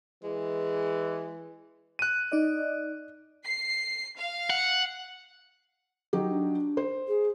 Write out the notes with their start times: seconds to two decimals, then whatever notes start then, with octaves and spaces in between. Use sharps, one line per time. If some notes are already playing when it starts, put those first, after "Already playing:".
0.24 E3 G#3
1.99 F#6 D#7
2.32 D#4 D5 D#5
3.45 C7
4.17 F5
4.50 F#5
6.13 F#3 D#4 G4
6.29 D4
6.77 C5
7.07 G#4